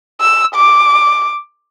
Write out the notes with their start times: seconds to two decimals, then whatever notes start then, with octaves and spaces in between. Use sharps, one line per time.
0.21 E6
0.55 D6